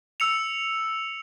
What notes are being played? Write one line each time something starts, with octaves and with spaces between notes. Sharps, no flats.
E6 C#7 F7